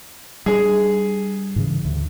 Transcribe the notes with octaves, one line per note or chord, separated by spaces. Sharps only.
G3 D4 G#4
G#2 C#3 E3
D2